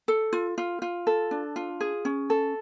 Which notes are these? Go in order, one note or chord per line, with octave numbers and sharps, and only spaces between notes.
A4
F4
F4
F4
A4
D4
F4
G#4
C#4
A4